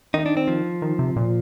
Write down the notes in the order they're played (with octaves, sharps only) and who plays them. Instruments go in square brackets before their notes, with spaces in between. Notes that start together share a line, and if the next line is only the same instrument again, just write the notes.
[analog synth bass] D#3 [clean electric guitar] D#4
[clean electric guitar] D4
C4
F3
[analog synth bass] D#3
C3
A#2